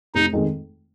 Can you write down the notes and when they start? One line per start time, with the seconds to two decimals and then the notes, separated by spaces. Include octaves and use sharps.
0.14 F1 D#4
0.33 F2 D#3 G#3 D#4